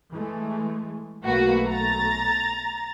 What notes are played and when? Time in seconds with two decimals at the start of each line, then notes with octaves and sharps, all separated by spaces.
0.12 E3 G#3 A3
1.24 B1 A3 A#3 F#4 B4
1.68 A#5 A6